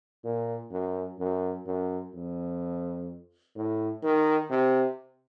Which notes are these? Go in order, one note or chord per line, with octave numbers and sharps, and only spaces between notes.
A#2
F#2
F#2
F#2
F2
A2
D#3
C3